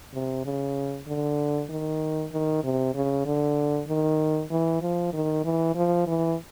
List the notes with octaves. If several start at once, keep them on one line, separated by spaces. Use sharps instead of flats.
C3
C#3
D3
D#3
D#3
C3
C#3
D3
D#3
E3
F3
D#3
E3
F3
E3